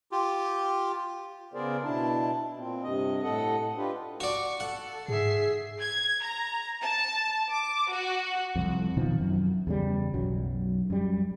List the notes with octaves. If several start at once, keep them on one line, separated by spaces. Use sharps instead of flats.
F4 G4
C#3 B3 G#4 A#4 C5 D5
B2 D4 E4 A5
A#2 C4
G2 C3 D#5
A2 A4 D#5 F#5
D4 F4 G4 B4
F#4 D5 C#6
A4 F#5
G#2 G#4 E5 C7
G#6
A#5
A5
D6
F#4
C2 F2
B2 D#3 F3 C4
F#2
E2 C#3 G3
B1 F#2 F#3
F#2 G3